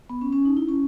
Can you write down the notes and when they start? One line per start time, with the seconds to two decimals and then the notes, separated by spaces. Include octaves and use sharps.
0.10 B3
0.21 C#4
0.33 C#4
0.45 D#4
0.57 E4
0.68 C#4